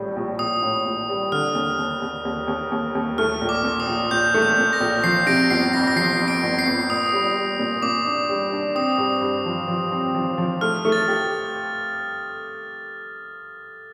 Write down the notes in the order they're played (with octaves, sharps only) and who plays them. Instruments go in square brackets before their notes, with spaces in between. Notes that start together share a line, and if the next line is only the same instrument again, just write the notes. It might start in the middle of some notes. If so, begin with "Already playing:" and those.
Already playing: [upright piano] A#1 A2 G3
A#1
[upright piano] A#1 [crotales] D#6
[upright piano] A2
A#1
G3
[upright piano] D3 [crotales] F6
[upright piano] D#2
D#2
D#2
D#2
D#2
D#2
D#2
[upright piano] A3 [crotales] F6
[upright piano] A#1
[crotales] D6
[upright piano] A#2
[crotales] D#6
[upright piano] A#1
[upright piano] A#1 [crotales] G6
[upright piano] A3
[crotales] G6
[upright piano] A#2
[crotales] A#6
[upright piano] A#1
[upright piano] F3 [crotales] C7
[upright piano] C3 [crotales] A#6 D7
[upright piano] G1 [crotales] C7
[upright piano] F2 [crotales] A#6
[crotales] A#6
[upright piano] F3 [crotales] C7
[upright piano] F2
[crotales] A#6 D7
[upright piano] G1
[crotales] C7
[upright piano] G1
[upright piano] A#2 [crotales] D#6
[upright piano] G3
G3
A#2
[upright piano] A#2 [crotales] D6
[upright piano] D4
G3
D4
[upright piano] C4 [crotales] D#6
[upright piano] G2
G2
F3
F3
C4
F3
F3
[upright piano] A3 [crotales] F6
[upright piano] A3
[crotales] A6
[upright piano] G4